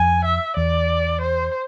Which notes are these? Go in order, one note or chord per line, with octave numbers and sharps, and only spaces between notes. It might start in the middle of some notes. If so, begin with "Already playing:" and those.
Already playing: F2 G#5
E5
E2 D5
C5